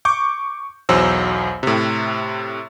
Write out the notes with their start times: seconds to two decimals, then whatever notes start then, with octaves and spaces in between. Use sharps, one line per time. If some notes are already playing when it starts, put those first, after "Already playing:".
0.05 C#6 D6 G6
0.89 B1 E2 F#3 C5 E6
1.63 A2 C3